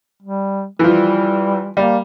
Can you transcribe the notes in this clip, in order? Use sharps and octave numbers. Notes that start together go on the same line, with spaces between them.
G3
E3 F3 G3
G3 A#3